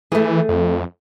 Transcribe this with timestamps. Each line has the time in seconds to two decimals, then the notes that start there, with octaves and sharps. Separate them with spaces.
0.12 E3 A3 G#4
0.49 F2